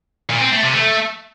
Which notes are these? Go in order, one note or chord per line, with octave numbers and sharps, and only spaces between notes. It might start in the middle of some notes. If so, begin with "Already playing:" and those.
A#2
C4
A3
C3
A3